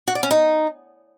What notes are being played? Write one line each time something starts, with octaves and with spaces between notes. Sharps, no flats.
F#4
D5
C#4
D#4